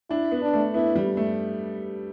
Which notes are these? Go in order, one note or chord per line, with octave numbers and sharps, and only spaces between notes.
D4 E4
B3
D4
A3
B3 E4
G3
A3